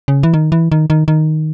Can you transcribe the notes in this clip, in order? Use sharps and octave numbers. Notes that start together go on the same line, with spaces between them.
C#3
E3
D#3
E3
D#3
D#3
D#3